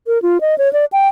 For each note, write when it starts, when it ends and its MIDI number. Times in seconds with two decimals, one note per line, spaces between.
0.07 0.21 70
0.22 0.41 65
0.41 0.57 75
0.58 0.71 73
0.73 0.85 74
0.93 1.08 79